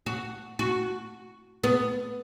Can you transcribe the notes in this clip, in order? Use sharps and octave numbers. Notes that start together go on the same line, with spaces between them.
F#4
F#4
B3